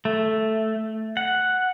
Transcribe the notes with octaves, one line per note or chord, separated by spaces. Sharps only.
A3
F#5